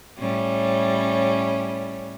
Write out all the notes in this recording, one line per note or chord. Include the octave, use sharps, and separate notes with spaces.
A2 G3 C#4